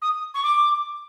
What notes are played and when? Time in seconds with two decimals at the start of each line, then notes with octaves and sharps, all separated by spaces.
0.02 D#6
0.34 C#6
0.43 D6